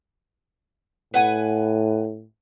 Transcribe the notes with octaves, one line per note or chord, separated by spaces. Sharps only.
A2 B4 F#5 G#5